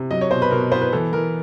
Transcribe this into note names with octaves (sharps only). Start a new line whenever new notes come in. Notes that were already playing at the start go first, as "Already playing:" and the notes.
Already playing: C3
F#3 D#5
C#5
B2 C5
B4
B2 A#4
B3 C5
B4
E3 A4
E3 A#4